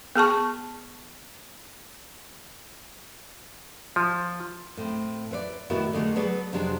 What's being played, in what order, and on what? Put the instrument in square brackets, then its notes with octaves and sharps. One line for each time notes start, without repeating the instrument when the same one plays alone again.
[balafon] B3 G#4 A5 C#6
[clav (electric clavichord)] F3
[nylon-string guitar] A2 C4
E4 B4 C5 D5
A2 D#3 B3 E4 F#4
D3 G#3 A3 G#4
F#3 B3 G#4 A4 B4 D5
F2 C3 F#3 G#3 D4 G#4